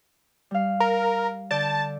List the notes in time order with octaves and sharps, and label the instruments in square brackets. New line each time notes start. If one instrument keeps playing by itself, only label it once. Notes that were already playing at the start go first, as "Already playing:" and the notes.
[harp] G3 F5
[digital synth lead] A#4
[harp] D3 D5 G6 [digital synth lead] A5